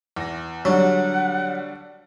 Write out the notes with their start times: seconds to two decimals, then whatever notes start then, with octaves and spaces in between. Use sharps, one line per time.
0.16 E2 A#6
0.65 D3 F#3 G3 F#5